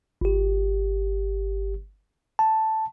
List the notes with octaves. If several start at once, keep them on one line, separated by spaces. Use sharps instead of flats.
G1 G4
A5